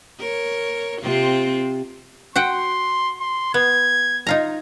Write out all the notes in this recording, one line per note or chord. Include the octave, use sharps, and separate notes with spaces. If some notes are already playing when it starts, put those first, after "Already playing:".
A#4 C#5
C3 C4 F4
F#4 F#5 G5 C6
C6
B3 G#6
D#4 F4 A#5